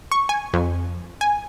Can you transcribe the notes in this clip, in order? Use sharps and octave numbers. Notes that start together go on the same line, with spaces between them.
C#6
G#5
F2
G#5